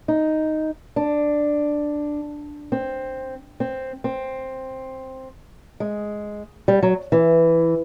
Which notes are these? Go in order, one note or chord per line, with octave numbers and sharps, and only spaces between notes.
D#4
D4
C4
C4
C4
G#3
G3
F#3
E3